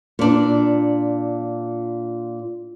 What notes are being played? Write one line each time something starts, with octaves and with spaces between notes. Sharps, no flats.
A#2 D4